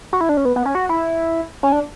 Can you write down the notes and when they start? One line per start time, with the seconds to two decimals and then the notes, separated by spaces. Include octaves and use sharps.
0.13 F#4
0.21 E4
0.29 D4
0.37 C#4
0.45 B3
0.56 B3
0.66 C#4
0.75 F#4
0.89 E4
1.63 C#4
1.72 D4